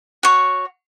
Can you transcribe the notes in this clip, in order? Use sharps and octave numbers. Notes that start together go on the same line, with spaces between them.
F#4 C#5